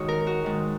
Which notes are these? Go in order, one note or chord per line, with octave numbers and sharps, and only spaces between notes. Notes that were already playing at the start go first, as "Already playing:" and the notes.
Already playing: G#2 D#3 F#4 G#4 C#5
A#4
F#4
G#2 D#3